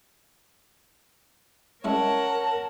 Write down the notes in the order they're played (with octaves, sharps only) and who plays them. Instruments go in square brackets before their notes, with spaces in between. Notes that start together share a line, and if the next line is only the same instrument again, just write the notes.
[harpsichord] G#3 C#4 E4 [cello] A#4 [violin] C#5 F#5 [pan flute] A5